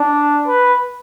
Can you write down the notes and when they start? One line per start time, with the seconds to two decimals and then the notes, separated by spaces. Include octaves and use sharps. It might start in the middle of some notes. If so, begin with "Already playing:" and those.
Already playing: D4
0.47 B4